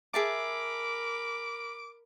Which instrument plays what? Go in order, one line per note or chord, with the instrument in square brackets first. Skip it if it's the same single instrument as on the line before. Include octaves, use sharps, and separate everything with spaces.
[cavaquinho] G#4 E5 A5 [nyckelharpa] A#4 B5 [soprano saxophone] D6